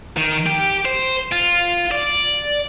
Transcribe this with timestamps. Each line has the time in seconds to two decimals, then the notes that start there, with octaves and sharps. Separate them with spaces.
0.17 D#3
0.47 G4
0.85 C5
1.32 F4
1.91 D5